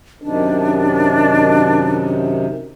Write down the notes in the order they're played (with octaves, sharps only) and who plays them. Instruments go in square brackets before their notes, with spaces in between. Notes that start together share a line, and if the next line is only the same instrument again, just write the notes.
[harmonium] F#2 C3 D#3 [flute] D4